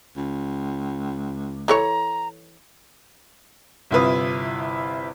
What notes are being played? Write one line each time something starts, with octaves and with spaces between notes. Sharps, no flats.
C#2
E3 A4 C#5 A#5
G1 C3 E4 F4 B4 D#6